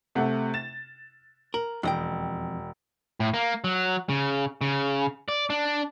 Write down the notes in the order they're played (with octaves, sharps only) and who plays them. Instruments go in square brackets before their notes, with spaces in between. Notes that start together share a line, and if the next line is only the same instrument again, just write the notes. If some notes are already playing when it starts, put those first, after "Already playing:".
[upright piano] C3 A3 F#5
A6 E7
[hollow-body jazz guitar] A#4 [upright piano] F#7
[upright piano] E1 [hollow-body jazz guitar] F2 D#5 G5
[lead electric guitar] A2
A#3
F#3
C#3
C#3
D5
D4